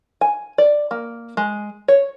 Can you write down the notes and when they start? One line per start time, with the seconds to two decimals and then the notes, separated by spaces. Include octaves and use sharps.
0.21 G#5
0.58 D5
0.91 A#3
1.37 G#3
1.88 C#5